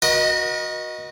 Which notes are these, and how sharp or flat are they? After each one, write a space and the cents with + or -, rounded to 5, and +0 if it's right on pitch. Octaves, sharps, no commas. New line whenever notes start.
F#4 -15 A#4 +45 D#5 +0